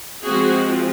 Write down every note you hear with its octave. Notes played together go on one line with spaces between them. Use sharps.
F3 G#3 C4 F#4 G#4